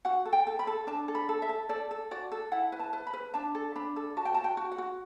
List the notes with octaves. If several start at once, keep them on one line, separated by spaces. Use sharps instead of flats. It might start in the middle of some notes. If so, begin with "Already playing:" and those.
F#4 F#5
A4
G5
A4
B5
A4
D4 A5
A4
B5
A4
E5
A4
A4 D5
A4
F#4 D5
A4
E4 F#5
B4
A5
B4
B5
B4
D4 A5
A4
D4 B5
A4
F#4 A5
G5
F#4 A5
G5
F#4
F#5
F#4